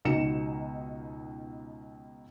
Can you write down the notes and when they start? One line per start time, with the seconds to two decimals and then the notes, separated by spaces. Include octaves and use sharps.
0.05 C#2 B2 D#4 C#7 E7